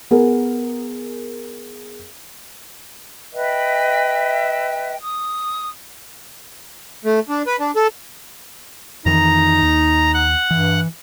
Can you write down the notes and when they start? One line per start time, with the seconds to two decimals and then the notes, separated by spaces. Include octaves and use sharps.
0.11 B3 G#4 A#4
3.33 B4 D#5 E5 G5
5.00 D#6
7.04 A3
7.29 D4
7.47 B4
7.60 D4
7.76 A4
9.06 F2 D#3 E3 D#4 A#5
9.62 D#2
10.14 F#5
10.51 G2 E3